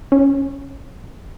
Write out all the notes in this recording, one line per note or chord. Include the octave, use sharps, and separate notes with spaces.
C#4